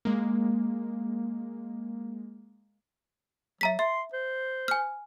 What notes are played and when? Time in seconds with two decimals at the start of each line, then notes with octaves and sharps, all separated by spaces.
0.05 G#3 A#3
3.61 F#3 E5 A#5 B6
3.79 E5 C6
4.13 C5
4.68 G#5 F6